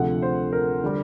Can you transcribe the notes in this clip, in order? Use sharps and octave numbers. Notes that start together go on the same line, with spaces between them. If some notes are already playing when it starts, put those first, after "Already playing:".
Already playing: D2 C3 F3 A3 F#5
C5
A#4
D3 G3